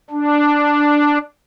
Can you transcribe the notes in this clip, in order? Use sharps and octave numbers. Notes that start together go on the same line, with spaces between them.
D4